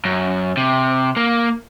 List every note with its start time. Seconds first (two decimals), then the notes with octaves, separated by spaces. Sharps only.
0.05 F#2
0.57 C3
1.17 A#3